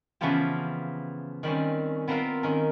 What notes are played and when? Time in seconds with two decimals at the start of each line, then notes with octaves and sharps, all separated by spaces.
0.21 C#3 E3 F3 B3 F4 G4
1.43 D#3 G3 C4 C#4
2.08 B3 C4 F4 A#4 B4 F5
2.43 D#3 C#4 A#4